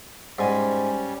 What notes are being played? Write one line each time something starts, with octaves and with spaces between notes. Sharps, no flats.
G#2 G3 C#4 G#5